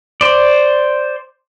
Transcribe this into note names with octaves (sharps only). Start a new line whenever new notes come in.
C5 D5